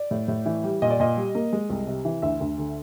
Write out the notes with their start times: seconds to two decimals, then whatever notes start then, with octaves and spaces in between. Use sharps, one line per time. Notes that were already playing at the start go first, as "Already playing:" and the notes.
Already playing: D5
0.11 A2
0.28 A2
0.46 E3
0.64 G3
0.82 A#2 D#5
0.90 D5
1.00 A#2 D#5
1.17 G3
1.35 A#3
1.53 G#3
1.70 C2
1.87 C3
2.05 E3
2.22 D2 E5
2.41 D2
2.58 D3